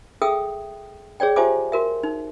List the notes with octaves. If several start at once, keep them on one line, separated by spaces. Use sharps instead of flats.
G#4 A4 E5 G5 D#6 E6
G#4 C#5 D5 G5
F4 G4 C5 E5 G#5 D6
F#4 A#4 E5
D#4